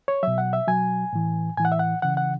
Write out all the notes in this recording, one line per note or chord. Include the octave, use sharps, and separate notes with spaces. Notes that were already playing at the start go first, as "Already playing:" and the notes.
C#5
B2 F#3 E5
F#5
E5
B2 F#3 G#5
A2 E3
A2 E3 G#5
F#5
E5
F#5
C#3 E3 F#5
F#5